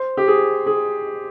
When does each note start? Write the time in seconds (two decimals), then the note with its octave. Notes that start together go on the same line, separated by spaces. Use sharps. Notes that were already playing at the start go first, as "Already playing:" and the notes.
Already playing: C5
0.17 G4
0.28 G#4
0.66 G#4